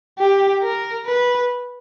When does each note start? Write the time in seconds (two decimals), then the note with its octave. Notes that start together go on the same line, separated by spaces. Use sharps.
0.19 G4
0.62 A#4
1.06 B4